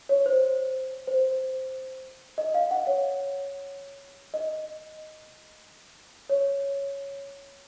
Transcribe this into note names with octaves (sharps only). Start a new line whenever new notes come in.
C#5
C5
C5
D#5
F5
F#5
C#5
D#5
C#5